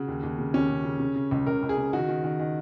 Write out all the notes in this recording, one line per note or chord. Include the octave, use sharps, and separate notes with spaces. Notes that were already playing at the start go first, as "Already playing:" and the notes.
Already playing: C#3 F#4
D#2
D#2
C#3
D#2 C#4
C#3
C#3
C#3
C#3
C#2
C#2 A#4
C#2
G#4
C#3
D#3 F#4
D#3
D#3
D#3